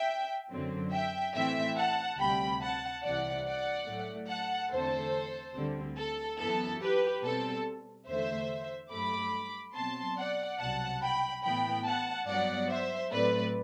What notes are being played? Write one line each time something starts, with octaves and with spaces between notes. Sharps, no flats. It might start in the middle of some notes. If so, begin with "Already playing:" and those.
Already playing: E5 G5
F#2 D3 F#3 C4
E5 G5
A2 E3 A3 C4 E5 G5
F#5 A5
D2 C3 G3 G5 B5
F#5 A5
C2 C3 E3 D5 F#5
D5 F#5
A2 F#3 A3
F#5 A5
E2 D3 A3 C4 A4 C5
D2 D3 G3 C4
A4
F#2 E3 B3 A4
G4 B4
B2 G3 C4 A4
E2 D3 A3 C5 E5
G2 F#3 A3 B5 D6
B2 F#3 C4 A5 C6
D5 F#5
C2 B2 F#3 F#5 A5
G5 B5
A2 E3 B3 G5 B5
F#5 A5
G2 F#3 B3 D5 F#5
C5 E5
A2 F#3 A3 C4 B4 D5